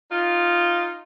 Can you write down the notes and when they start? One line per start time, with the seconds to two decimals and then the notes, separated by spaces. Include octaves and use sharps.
0.10 D#4 F4